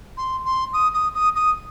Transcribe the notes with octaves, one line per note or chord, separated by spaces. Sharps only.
C6
C6
D#6
D#6
D#6
D#6